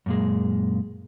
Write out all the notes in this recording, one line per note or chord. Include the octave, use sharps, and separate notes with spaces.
F#2 A#2 G#3